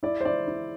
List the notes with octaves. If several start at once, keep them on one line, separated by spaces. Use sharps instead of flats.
E4 D5
C5
E4 D5
E4